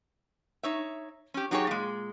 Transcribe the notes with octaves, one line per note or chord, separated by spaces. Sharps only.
D#4 C#5 E5
C#4 G4
F#3 D#4 G4 G#4 C#5
A#2 G#3